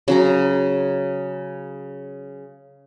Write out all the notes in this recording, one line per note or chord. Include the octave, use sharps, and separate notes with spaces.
C#3 F#3 A#5